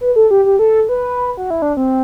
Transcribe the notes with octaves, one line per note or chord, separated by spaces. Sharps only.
B4
A4
G4
G4
A4
B4
F#4
E4
D4
C4